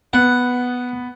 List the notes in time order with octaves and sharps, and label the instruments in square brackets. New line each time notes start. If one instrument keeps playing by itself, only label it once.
[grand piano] B3 [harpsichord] F#5